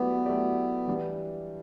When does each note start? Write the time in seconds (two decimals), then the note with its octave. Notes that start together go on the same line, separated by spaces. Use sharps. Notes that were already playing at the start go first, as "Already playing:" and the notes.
Already playing: F#3 A3 B3 E4 G4 D5
0.26 F#3 A3 E4 G4 D5
0.88 E3 G3 D4